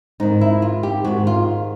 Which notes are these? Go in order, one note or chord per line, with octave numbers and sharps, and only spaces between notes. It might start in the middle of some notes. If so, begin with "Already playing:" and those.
G#2 D#3 D#4
E4
F4
G4
G#2 D#3 F#4
F4